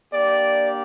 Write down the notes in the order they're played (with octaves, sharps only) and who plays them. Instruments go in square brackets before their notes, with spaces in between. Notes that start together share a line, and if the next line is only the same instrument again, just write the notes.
[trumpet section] A#3 D4 G4 D5